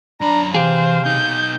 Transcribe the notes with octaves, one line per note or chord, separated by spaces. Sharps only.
F#2 D4 A#5 B5
C3 E3 G4 G#4 C5 F5
B2 D#4 G6